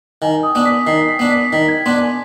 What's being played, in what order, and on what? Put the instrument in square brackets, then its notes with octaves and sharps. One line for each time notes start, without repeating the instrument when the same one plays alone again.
[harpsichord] D#3 [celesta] G#5
[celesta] D#6
[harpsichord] B3 D4
[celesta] B6
[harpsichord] D#3 [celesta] C7
[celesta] B6
[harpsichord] B3 D4
[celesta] B6
[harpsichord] D#3 [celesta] B6
[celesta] G#6
[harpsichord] B3 D4 [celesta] C6
[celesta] G#5